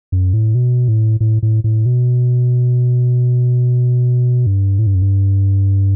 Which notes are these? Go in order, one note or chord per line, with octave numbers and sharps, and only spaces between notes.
F#2
A2
B2
A2
A2
A2
A2
B2
G2
A2
G2
F#2
G2